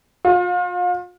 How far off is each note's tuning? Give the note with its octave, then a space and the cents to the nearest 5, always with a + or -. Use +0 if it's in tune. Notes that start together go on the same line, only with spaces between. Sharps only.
F4 +35